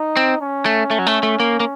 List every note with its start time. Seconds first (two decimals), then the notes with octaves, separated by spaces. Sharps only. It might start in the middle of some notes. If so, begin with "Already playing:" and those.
Already playing: D#4
0.17 C4
0.41 C#4
0.66 A3
0.91 A3
0.99 F#3
1.07 A3
1.23 A3
1.40 A#3
1.60 A#3